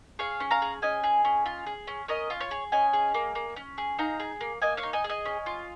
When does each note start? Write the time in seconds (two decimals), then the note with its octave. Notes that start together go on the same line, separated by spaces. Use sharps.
0.19 G#4 C#5 F5
0.40 C#4
0.51 F5 A#5
0.62 G#4
0.82 C#4 D#5 G#5
1.03 G#4
1.25 C#4
1.46 F4
1.66 G#4
1.87 C#4
2.08 C#4 A#4 D#5
2.30 F4
2.40 C#5
2.51 G#4
2.72 C#4 D#5 G#5
2.93 G#4
3.14 A#3
3.35 A#3
3.56 C#4
3.78 G#4
3.99 D#4 F5 A#5
4.20 G#4
4.41 A#3
4.62 A#3 D#5 G#5
4.77 C#5 F5
4.83 D#4
4.93 D#5 G#5
5.04 G#4
5.09 D#5 G#5
5.25 C#4
5.46 F4